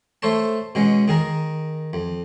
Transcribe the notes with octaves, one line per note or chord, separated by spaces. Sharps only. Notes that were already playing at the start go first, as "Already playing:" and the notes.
A3 A4 C5 C#5 A5
B2 G#3 C#4
D#3 G#4 A#4
F2